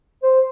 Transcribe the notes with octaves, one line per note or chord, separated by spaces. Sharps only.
C5